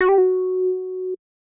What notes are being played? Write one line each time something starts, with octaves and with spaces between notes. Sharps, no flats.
F#4
G4
F#4